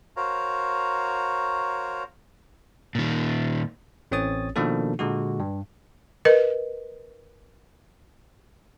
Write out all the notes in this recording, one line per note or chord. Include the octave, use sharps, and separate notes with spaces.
F#4 A#4 C5 C#5 F5 A#5
A#2 D#3
A1 C4 C#4 C#5 D#6 A6
B2 D#3 F3 A#3 D4 A4
A#2 D3 G#3 F#4
G2
A#4 B4 D#5